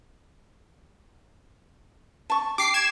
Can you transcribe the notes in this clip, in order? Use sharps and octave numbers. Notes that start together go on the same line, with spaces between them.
A5 C#6
G4 D6 C7
G#6 E7